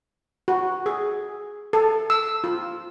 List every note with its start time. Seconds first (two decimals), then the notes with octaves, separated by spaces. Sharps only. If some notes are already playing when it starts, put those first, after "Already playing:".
0.48 F#4
0.86 G#4
1.73 A4
2.10 E6
2.44 F4